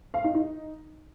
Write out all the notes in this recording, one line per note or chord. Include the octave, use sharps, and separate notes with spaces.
F5
D#4
D#4